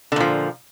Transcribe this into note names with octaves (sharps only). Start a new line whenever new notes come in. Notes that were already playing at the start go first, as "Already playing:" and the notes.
A#2 D3 F3